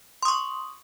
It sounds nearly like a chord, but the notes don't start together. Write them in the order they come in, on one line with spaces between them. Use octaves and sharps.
C6 D#6 C#6